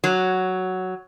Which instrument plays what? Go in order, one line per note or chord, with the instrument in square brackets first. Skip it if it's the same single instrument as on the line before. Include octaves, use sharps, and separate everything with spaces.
[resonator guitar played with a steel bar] F#3